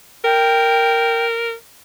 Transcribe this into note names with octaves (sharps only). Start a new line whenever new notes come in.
A#4 G5